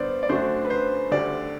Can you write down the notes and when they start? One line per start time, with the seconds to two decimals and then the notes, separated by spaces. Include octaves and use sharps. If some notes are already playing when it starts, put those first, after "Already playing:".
Already playing: G2 D3 B3 C5 D5
0.23 D5
0.29 F#2 D3 A3 D4 F#4 C5
0.65 B4
0.70 C5
1.11 D2 D3 G3 D5